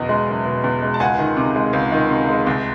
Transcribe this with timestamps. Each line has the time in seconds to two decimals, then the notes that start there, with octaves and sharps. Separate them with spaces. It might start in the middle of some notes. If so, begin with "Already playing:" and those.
Already playing: F#1 E2 B2 D#5
0.09 G#3
0.28 F#1
0.45 B2
0.64 E2
0.82 G#3
0.94 A5
1.00 C#2 F#5 G#5
1.19 D#3
1.37 C3
1.56 G#3
1.73 C#2
1.92 D#3
2.10 C3
2.29 G#3
2.47 C2